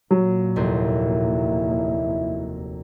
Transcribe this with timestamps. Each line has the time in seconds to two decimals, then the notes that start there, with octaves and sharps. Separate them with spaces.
0.11 A#2 F#3
0.56 F1 D#2 E4 C5